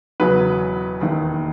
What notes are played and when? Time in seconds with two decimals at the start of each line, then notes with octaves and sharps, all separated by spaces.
0.20 E1 E2 C#3 F#3 B3 B4
1.01 E1 D#2 D#3